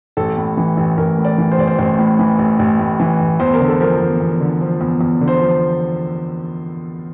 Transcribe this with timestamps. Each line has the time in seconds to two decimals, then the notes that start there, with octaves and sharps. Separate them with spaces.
0.17 A1 A4
0.37 A2
0.57 E3
0.77 A1
0.98 A1 A#4
1.18 A2
1.25 D5
1.38 E3
1.52 C5
1.58 A1 D5
1.68 C5
1.78 A1 C5
1.99 A2
2.19 E3
2.39 A1
2.59 A1
2.79 A2
3.00 E3
3.20 A1
3.40 E2 C5
3.54 A#4
3.60 D3
3.68 A4
3.80 F3 A#4
4.00 E2
4.20 E2
4.41 D3
4.61 F3
4.81 E2
5.01 E2
5.21 D3
5.28 C5
5.42 F3